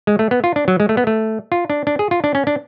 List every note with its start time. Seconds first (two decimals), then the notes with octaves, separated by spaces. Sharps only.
0.07 G#3
0.19 A3
0.31 B3
0.44 F4
0.56 D4
0.68 F#3
0.80 G#3
0.89 A3
0.97 B3
1.07 A3
1.52 F4
1.70 D4
1.87 D4
1.99 G#4
2.11 F4
2.24 D4
2.35 C#4
2.47 D4